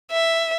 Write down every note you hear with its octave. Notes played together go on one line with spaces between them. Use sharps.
E5